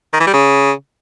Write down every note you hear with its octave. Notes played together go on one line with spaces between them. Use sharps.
D#3
E3
G3
C#3